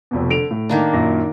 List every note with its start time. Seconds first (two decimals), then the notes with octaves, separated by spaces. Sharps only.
0.11 F1 F2 B2
0.30 D3 D7 F7
0.51 A2
0.69 D#3 A#3 D4
0.93 F#2 A#2 A#6